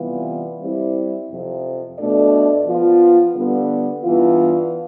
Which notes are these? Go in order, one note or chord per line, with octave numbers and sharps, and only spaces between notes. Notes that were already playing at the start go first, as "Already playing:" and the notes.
Already playing: C3 E3 G3 B3 F4
G3 C4 E4
F2 C3 F3
B2 A3 D4 A4 D5
F3 B3 F4
D3 G3 B3
G2 E3 B3 F4